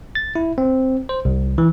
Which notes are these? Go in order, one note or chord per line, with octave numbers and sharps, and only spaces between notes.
A6
E4
C4
C5
C2
E3